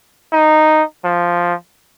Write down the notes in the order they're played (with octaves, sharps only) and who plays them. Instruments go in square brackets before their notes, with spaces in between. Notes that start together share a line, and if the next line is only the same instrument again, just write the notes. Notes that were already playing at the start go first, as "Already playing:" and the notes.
[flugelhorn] D#4
F3